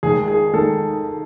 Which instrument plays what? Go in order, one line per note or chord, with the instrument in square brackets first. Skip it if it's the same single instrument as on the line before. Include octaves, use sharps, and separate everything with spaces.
[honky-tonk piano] D#2 D#3 G#3 [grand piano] G#4
[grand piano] G#4
[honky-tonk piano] D#3 G#3 [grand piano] A4